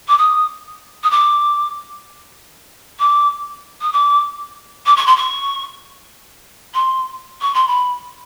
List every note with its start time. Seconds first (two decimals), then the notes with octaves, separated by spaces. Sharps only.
0.08 D6
0.17 D#6
1.03 D#6
1.10 D6
2.99 D6
3.81 D#6
3.92 D6
4.86 D6
4.96 C#6
5.06 C6
5.16 C#6
6.74 C6
7.41 C#6
7.54 C6
7.67 B5